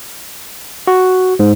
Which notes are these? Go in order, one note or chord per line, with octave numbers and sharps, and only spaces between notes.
F#4
G#2